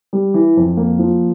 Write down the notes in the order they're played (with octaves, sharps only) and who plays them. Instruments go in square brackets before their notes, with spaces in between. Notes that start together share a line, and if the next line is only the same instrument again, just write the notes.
[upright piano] G3
E3
F2
A#3
F3